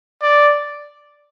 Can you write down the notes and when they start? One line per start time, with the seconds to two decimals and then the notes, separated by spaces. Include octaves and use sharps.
0.22 D5